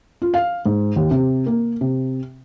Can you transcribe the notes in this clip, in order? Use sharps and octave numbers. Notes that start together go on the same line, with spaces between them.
F4
F5
G#2
D#2
C3
A#3
C3